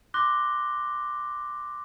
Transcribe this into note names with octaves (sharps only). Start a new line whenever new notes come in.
C6 D6 F#6 A#6 G7